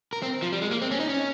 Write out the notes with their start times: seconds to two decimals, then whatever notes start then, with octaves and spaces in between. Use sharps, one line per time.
0.13 A#4
0.22 C4
0.42 F3
0.53 G3
0.62 G#3
0.71 A#3
0.82 C4
0.91 C#4
1.00 D#4
1.09 C#4